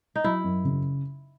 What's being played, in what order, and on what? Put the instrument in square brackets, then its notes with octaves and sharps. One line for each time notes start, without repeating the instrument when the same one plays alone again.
[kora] D#4
[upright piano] F#3 [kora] E4
[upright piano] F#2
C#3